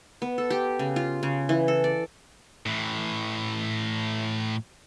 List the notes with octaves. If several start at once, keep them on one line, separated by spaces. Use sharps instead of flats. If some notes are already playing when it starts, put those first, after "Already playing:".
B3
A4
G4
C#3
F4
C#3
E3
A4
D5
A2 E3